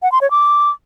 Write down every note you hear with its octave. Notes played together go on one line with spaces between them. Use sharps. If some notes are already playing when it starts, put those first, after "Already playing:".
F#5
C6
C#5
D6